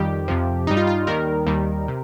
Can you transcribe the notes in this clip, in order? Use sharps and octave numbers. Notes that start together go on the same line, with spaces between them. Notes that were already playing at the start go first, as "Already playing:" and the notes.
Already playing: F2 D#3 G3 G4
F2 C3 F3
G2 G3 D#4
F4
F4
D#2 D#3 G3 A#4
D#2 D#3 G3
C3